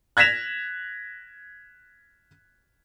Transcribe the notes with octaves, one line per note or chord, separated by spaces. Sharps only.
F#6 G#6 A#6 B6 E7 F7